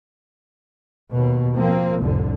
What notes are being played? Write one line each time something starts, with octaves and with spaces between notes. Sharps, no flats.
D#2 B2
F3 A#3 C4
F1 C2 A2 D3